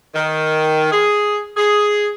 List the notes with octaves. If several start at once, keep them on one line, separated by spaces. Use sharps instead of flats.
D#3
G#4
G#4